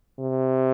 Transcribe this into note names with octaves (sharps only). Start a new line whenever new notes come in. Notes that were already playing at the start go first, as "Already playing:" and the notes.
C3